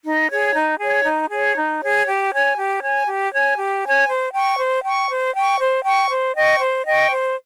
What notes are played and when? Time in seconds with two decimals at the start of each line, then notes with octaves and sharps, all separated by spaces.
0.04 D#4
0.29 G#4 C#5
0.54 D#4
0.79 G#4 C#5
1.05 D#4
1.30 G#4 C#5
1.56 D#4
1.81 G#4 C#5
2.06 G4
2.31 C#5 G#5
2.56 G4
2.82 C#5 G#5
3.06 G4
3.32 C#5 G#5
3.58 G4
3.83 C#5 G#5
4.08 C5
4.33 G5 C#6
4.58 C5
4.84 G5 C#6
5.09 C5
5.34 G5 C#6
5.59 C5
5.84 G5 C#6
6.10 C5
6.35 D#5 G5 C#6
6.60 C5
6.86 D#5 G5 C#6
7.10 C5